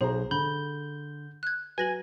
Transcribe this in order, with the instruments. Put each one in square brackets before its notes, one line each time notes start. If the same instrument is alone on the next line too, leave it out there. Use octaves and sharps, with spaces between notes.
[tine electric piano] B1 [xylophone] G#4 [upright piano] C5 A#5
[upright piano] D3 [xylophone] B5 [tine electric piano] G6
[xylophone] F#6 G#6
[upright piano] F#3 [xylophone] B4 A#6 F#7 [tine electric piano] G#5